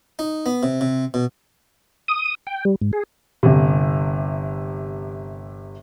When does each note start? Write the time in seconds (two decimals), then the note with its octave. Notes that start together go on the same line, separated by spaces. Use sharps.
0.19 D#4
0.46 B3
0.63 C3
0.81 C3
1.14 B2
2.08 D#6
2.47 G5
2.65 G3
2.81 G#2
2.93 G#4
3.43 G1 C3